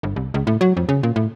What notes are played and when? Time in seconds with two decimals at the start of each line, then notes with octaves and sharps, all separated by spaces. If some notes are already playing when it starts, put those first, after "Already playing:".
0.03 G1
0.16 C2
0.34 C#2
0.47 A2
0.61 F#3
0.77 F2
0.89 C#3
1.03 A#2
1.16 A2